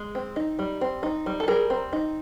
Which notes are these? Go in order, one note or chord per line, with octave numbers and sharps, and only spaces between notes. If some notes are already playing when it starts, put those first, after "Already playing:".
Already playing: G#3
C4
D#4
G3
C4
D#4
G3
A4
G3 G#4 A#4
C4
D#4